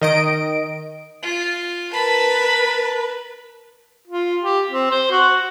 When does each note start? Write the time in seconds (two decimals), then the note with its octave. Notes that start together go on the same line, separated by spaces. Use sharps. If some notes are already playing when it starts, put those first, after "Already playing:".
0.01 D#3 D#5 D7
1.23 F4
1.93 A#4 B4 A5 B5
4.08 F4
4.42 G4
4.71 C4
4.91 C5
5.11 F#4